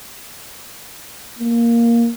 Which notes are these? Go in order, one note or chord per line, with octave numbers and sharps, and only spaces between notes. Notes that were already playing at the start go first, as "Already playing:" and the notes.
A#3